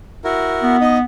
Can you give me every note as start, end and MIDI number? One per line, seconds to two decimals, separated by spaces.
0.24 0.76 64
0.24 0.76 66
0.24 0.76 70
0.63 1.03 59
0.81 0.98 63
0.81 0.98 75